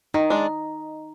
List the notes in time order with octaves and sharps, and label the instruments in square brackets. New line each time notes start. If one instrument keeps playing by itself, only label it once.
[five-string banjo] D#3 [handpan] D#4
[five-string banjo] G#3 D4